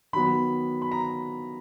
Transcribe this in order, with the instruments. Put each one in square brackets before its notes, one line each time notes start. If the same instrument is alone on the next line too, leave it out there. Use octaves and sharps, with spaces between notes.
[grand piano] D#3 F#3 B3 B5
B5
A#5